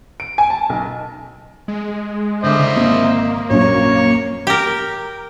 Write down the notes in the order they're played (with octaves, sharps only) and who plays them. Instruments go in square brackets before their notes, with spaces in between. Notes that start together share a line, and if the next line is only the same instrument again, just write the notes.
[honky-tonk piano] D7
G#5
A5
B1
[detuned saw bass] G#3
[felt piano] D3 D6 [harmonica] C5 D#5 E5
[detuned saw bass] C#3
[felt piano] G#1 [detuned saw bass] A#3
[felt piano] A#1 F#2 F#3 [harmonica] C#5
[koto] G4 A#4